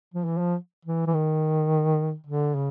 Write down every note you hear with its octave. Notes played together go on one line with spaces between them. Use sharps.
F3
E3
F3
E3
E3
D#3
D3
C#3